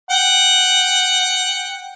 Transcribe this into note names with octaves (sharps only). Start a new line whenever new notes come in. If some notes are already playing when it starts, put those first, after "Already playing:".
F#5 G5